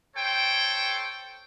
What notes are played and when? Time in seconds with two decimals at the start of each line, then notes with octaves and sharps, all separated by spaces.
0.16 A4 C5 C#5 G5